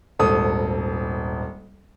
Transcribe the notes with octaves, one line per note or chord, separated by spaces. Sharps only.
D#1 G#1 A4 D#6